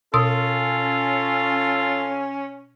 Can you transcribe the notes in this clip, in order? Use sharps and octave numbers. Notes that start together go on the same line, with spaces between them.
B2 C#4 F4 A4 D#6 E6